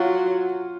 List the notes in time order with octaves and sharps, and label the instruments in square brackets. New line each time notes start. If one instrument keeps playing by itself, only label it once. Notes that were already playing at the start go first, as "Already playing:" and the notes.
Already playing: [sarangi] F#3 [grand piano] F4